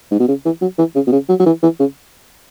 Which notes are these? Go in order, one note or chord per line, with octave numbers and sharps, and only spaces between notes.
G#2
B2
C#3
E3
F#3
E3
C#3
B2
C#3
F#3
F#3
E3
E3
C#3